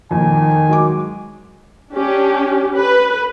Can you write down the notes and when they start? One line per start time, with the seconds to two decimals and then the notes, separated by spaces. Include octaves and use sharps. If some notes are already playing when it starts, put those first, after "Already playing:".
0.11 F2 A#2 D#3 G#5
0.69 F#3 G#3 D6
1.93 C#4 D4 G4
2.76 B4